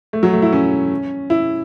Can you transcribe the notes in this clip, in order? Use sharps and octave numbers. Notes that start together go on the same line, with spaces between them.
A3
F#3
A3
E4
C#4
E4